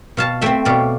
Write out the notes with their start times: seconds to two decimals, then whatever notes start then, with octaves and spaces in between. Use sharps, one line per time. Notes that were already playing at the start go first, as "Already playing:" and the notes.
0.17 B2 F5 A5
0.41 A3 C4 E5 G5
0.65 B2 D5 F5